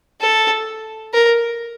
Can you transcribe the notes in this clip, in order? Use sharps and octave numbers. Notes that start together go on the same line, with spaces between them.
A4
A#4